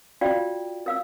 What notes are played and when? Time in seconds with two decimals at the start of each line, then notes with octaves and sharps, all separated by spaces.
0.21 F4 F#4 D5 F5 G5
0.86 A#4 F5 E6